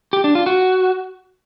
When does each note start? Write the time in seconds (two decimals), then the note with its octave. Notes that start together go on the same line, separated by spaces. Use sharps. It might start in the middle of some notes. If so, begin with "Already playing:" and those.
0.13 G4
0.24 D4
0.35 F4
0.46 F#4